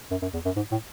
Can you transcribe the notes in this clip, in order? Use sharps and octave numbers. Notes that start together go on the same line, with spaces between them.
F#2
F#2
E2
F#2
G#2
A2